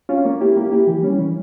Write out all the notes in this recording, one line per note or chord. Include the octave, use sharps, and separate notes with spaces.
C#4 F4
A#3
E4 G4
A#3
E4 G4
E3
G3 C#4
E3